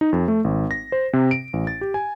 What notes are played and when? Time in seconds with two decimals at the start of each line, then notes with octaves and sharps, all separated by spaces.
0.01 D#4
0.13 F2
0.28 A3
0.44 G#1
0.71 A#6
0.92 C5
1.13 C3
1.31 D7
1.53 A1
1.67 A6
1.81 G4
1.94 G#5